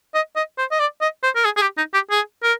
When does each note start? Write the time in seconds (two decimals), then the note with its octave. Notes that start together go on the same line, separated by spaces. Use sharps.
0.14 D#5
0.36 D#5
0.58 C5
0.71 D#5
0.80 D5
1.01 D#5
1.23 C5
1.35 A#4
1.45 G#4
1.57 G#4
1.61 G4
1.77 D#4
1.94 G4
2.10 G#4
2.43 A#4